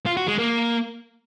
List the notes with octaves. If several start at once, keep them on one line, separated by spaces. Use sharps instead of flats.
F4
F#4
G#3
A#3